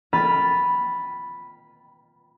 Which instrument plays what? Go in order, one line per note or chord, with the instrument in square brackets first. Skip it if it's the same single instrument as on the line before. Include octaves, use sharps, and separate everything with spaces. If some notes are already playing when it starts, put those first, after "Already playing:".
[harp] G5 B5 F6 A6 D#7